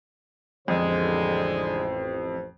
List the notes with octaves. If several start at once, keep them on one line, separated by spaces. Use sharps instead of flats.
A1 F2 D3 G#3 C5